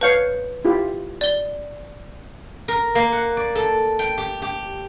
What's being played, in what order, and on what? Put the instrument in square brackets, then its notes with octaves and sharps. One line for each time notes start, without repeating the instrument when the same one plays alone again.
[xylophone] B4 G6 C#7 [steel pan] C#5 F5 A5
[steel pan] E4 F4 G4
[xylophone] D5 G7
[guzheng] A#4
A#3
F#5
D5
A4
G5
G4
G4